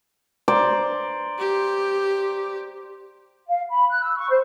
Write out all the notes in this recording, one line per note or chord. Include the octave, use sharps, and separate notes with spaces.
C5 D5 A#5
G4
F5
B5
F#6
E6
C#6
C5